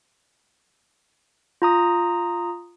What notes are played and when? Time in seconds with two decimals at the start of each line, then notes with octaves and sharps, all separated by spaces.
1.62 F4 A#5 D#6